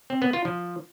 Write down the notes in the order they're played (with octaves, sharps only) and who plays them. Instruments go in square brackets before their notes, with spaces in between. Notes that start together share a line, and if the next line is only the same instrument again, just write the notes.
[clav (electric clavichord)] C4
B3
F4
F3